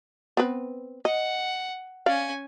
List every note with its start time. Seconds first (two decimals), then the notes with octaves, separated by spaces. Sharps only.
0.37 B3 C4 B4
1.05 D#5 F#5
2.06 C#4 D5 F5 G#5